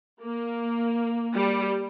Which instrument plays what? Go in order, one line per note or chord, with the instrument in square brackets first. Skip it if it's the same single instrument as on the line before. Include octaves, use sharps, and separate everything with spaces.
[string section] A#3
G3